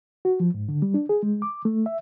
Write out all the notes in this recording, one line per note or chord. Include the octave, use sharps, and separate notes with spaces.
F#4
F3
G#2
D3
G3
D4
G#4
G#3
D6
A3
E5